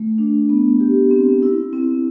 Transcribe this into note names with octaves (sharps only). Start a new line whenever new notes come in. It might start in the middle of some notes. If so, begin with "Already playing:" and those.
Already playing: A3
D4
B3
G4
C4
E4
C4